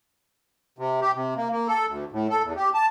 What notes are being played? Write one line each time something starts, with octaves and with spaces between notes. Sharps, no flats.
C3
G4
C3
A#3
A#3
A4
D2
A2
A4
E2
G4
A5